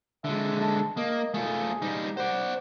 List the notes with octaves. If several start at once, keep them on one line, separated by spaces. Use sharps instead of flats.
D3 G#3 E5
A4
A#3 D#5
A3 F4 G#4
G3 D#4
C5 D5 F#5